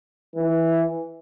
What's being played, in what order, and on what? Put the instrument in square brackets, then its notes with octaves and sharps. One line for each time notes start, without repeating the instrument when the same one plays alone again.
[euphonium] E3